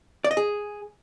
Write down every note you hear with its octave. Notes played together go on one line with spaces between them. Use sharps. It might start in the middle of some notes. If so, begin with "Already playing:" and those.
D5
D#5
G#4